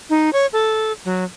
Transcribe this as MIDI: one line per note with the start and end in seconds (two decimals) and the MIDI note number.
0.10 0.30 63
0.33 0.46 73
0.53 0.92 69
1.05 1.24 54